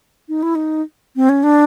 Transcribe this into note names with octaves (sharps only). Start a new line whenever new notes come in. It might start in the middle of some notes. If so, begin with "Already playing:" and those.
D#4
E4
D#4
C4
C#4
D4